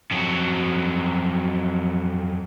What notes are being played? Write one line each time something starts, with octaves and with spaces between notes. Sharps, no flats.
F2 F#3